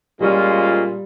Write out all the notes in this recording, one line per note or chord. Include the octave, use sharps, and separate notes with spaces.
A#2 G3 G#3 C#4 F4